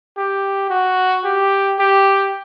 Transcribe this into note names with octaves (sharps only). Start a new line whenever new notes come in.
G4
F#4
G4
G4